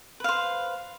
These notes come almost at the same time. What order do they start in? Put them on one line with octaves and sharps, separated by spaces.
B4 F5 C5